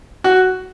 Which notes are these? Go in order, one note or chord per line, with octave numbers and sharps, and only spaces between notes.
F#4